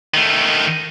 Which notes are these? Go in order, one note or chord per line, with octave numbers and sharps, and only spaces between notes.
D#3 A3